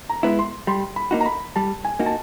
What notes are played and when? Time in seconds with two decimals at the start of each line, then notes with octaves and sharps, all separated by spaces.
0.10 A#5
0.23 G#3 B3 E4
0.39 C6
0.67 G3 C6
0.96 B5
1.11 A#3 D#4 F#4
1.21 A#5
1.26 B5
1.56 G3 A5
1.85 G#5
1.99 A#3 D#4 F#4
2.06 A5